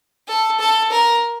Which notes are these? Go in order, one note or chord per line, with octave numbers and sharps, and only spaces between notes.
A4
A4
A#4